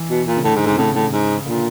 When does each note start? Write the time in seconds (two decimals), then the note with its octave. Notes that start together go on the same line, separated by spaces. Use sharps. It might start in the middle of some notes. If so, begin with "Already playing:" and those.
Already playing: E3
0.10 B2
0.27 A#2
0.36 C#3
0.44 A2 D3
0.56 G#2
0.66 G#2 C3
0.78 A2 C#3
0.95 A2
1.12 G#2
1.46 A#2 D3